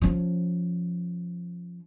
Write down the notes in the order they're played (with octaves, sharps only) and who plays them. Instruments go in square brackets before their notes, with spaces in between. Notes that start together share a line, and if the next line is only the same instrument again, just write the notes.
[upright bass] F3 C#4